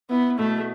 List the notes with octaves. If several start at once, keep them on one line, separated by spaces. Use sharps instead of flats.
B3 E4
B2 A3